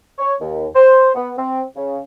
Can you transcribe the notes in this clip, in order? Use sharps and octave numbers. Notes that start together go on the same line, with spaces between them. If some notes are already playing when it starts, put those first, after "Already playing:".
C#5
D#2
C5
B3
C4
C#3